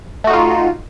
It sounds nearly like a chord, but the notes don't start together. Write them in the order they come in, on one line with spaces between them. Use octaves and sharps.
A3 F#4 D#4 F4